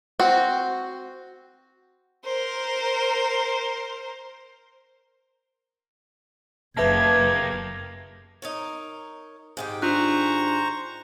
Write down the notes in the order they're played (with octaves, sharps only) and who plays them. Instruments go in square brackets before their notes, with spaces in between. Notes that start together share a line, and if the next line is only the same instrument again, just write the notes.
[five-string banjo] C4 F#4
[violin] A#4 C5
[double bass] F#1 C#3 [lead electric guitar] A#3 G4 [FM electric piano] B4 E5 A5 [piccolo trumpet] G#6
[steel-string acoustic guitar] D#4 A#4 C#5
G#2 D#3 G4
[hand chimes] D4 F4 F#6 [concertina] C5 A#5 C#6